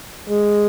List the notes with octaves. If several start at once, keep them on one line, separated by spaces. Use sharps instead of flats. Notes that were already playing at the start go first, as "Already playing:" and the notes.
G#3